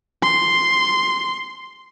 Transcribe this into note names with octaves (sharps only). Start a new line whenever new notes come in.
C6